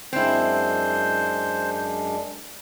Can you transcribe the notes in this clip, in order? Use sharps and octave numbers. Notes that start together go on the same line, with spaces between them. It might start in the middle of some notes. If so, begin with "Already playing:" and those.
F#2 G#3 C4 D4 E4 C5